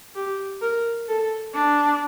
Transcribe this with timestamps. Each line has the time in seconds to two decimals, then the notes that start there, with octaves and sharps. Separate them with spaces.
0.15 G4
0.62 A#4
1.08 A4
1.54 D4